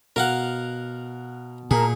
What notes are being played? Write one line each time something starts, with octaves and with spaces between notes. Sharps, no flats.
B2 A#4 F5 F#5
A#2 G#4 A#4 A5 A#5